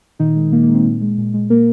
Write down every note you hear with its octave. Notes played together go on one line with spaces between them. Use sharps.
A#2 D#3 D#4
G#3
A#2 A#3
A#3
G#3
C4
A#2
G#3
A#2
G#3
A#2 A#3 A#4